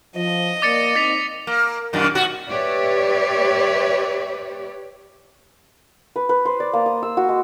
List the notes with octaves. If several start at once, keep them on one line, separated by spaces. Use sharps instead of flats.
F3 D#5
A#3 D5 D6 A6 C#7
C4 D#4 A6 B6 F7
A#3
F#2 A#2 D#3
B2 F#4
G4 B4 C#5 D5 E5
B4
B4
C5
D5
A#3
D#6
E6
F#4
G#3